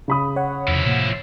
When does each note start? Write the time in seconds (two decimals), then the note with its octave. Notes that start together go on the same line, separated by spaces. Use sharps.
0.08 C#3 B5 D#6
0.36 C#5 F#5
0.68 E2 C3 F3 E4
0.85 A2 C3 A#3